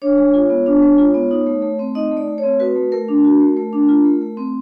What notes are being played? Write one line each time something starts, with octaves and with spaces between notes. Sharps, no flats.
D4 C#5
G#3
F4
B3
D4
G#3
F4
B3
D#4
A3
A3
C4
D#4 D#5
A3
D5
A3
C#5
C4
F#4 B4
A3
A3 A#4
D4
F#4
A3
A3
D4
F4
A3
A3
C4